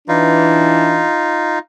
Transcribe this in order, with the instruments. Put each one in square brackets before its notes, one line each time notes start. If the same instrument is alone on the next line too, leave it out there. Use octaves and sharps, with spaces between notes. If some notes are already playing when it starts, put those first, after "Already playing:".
[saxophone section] E3 D4 [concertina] D#4 F4